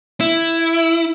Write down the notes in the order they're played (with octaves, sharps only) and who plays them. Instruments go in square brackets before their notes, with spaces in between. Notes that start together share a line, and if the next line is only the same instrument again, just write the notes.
[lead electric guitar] E4